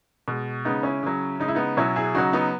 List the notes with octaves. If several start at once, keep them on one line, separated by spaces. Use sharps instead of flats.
B2 G#3
C#3 G#3 B3 D#4
C#4 E4
C#3 F#3
C#3 G#3 D#4 E4
B3 D#4
B2 F#3 C#4 E4
E4 G#4
C#3 F#3 D#4 F#4
B3 D#4